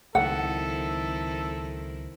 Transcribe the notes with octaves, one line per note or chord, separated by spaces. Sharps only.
C#2 D#3 F#3 C4 E4 A4 F#5